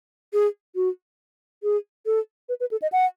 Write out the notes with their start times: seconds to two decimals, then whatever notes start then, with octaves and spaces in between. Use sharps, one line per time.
0.33 G#4
0.76 F#4
1.63 G#4
2.06 A4
2.49 B4
2.60 B4
2.71 A4
2.82 D#5
2.92 F#5